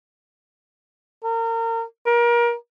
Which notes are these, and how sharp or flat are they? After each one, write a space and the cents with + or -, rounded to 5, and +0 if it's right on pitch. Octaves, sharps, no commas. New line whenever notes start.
A#4 -30
A#4 +30